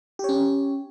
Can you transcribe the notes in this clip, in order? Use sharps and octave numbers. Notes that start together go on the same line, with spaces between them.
C#4 G4 C#5